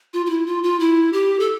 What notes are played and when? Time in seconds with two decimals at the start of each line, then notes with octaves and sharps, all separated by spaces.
0.13 F4
0.26 F4
0.30 E4
0.47 F4
0.63 F4
0.80 E4
1.13 G4
1.40 A4